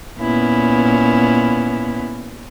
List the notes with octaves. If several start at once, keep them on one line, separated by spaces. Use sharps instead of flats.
A#2 B3 C#4 E4